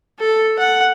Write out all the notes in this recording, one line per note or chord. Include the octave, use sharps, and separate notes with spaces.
A4
F#5